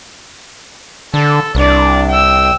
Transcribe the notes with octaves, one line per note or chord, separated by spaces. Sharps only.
D3 A4
C2 D4 D5
G5 E6